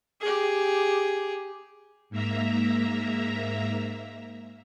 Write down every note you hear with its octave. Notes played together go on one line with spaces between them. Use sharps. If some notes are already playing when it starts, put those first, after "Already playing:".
G4 G#4
G#2 A#3 E5 A#5